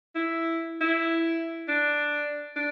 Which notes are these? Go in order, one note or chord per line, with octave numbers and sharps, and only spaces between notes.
E4
E4
D4
D4